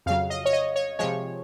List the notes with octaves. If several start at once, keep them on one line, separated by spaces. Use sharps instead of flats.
F2 C#3 F#3 F5
D#5
C#5
D#5
C#5
C3 F3 G#3 C#5